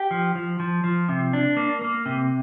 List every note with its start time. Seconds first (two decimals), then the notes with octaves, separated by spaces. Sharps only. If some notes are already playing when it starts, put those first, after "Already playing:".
Already playing: G4
0.11 F3
0.36 F3
0.60 F3
0.84 F3
1.09 C3
1.33 D4
1.57 A#3
1.81 A#3
2.06 C3